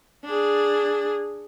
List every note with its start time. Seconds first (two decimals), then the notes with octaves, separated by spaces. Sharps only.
0.25 D4 G#4